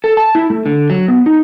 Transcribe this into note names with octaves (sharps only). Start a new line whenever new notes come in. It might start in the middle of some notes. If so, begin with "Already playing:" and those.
A4
A5
E4
A3
D3
F#3
B3
D#4